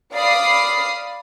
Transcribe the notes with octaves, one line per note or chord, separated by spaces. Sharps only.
D5 F5 B5 D#6 C7